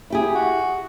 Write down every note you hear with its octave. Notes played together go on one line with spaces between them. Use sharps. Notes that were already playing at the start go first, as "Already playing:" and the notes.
E4 G4 G#4
F#4